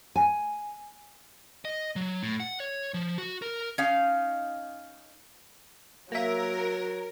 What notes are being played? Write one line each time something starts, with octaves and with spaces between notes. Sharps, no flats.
G#5
D#5
F#3
A2
F#5
C#5
F3
F#4
A#4
C#4 D#4 F5
F#3 A#3 A#4 E5